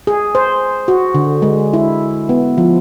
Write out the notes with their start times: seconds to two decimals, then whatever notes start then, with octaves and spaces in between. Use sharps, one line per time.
0.07 G#4
0.35 C5
0.88 F#4
1.15 D3
1.42 G#3
1.73 E4
2.29 B3
2.58 F3